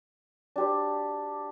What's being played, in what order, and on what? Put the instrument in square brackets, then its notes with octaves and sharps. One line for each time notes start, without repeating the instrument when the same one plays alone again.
[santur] D4 G4 C5